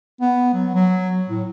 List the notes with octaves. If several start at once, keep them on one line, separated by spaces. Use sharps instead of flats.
B3
F#3
F#3
A2